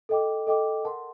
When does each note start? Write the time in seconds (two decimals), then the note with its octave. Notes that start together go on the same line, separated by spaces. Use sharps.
0.09 A4 D#5 G5 D6
0.47 A4 D#5 G5 D6
0.84 A#4 F#5 A5 C6